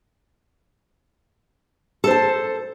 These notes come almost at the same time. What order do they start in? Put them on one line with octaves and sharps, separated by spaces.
A4 C5 A5